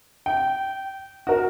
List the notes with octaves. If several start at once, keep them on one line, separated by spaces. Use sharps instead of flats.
G5
F#4 A#4